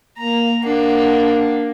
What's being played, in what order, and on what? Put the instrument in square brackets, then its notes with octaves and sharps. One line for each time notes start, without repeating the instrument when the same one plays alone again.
[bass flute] A#3 [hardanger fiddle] A#5
[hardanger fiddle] A#3 [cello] D4 [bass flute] F#5